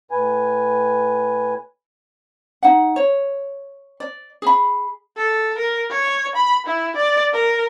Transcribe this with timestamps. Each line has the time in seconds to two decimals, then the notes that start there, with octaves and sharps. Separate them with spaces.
0.11 A2 B4 G#5
2.63 D#4 F#5
2.96 C#5
4.00 D5
4.42 G#4 B5
5.17 A4
5.58 A#4
5.91 C#5
6.35 B5
6.66 E4
6.96 D5
7.33 A#4